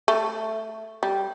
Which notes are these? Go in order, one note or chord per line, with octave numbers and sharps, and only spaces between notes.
A3
G3